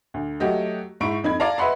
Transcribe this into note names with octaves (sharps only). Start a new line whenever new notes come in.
D2
F#3 A3 F#4 G4 D#5
G#2 E4 C#6 D7
F2 D#4 B5 G#6
D5 F5 A5 A#5
B4 D#5 E5 F#5 B5 C6